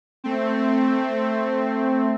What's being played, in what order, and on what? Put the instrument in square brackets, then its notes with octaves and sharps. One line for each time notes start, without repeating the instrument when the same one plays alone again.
[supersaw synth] A3 C4